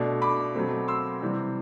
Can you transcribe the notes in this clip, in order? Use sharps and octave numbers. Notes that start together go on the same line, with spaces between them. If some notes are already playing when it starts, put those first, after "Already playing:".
Already playing: B2 A3 D4
B5 D6
B2 F#3 A3 C4
C6 E6
C3 E3 G3 C4